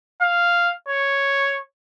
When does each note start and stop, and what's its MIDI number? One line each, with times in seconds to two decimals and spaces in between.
0.21 0.71 77
0.89 1.59 73